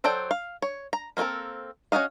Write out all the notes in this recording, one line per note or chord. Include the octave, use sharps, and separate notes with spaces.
F#3 A4 C5 D5 G5
F5
C#5
A#5
A#3 C4 F4 A4 A#4
C#4 D4 F#4 D#5 F5